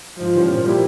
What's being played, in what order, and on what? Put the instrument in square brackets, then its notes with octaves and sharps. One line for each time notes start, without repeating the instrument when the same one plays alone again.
[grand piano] G#2 [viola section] F3
[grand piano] E3 G3 C#4 F4
A#2
G3 A#3 E4 G4